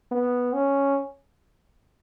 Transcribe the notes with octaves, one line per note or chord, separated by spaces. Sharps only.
B3
C#4